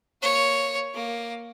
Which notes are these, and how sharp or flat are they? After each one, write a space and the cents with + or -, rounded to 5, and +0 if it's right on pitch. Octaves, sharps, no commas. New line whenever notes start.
A#3 +0 C#5 +0
A#3 +0 D6 +10